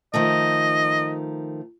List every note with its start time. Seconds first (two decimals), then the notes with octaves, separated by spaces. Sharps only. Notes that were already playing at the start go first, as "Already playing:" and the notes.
0.14 D#3 F3 A3 D#5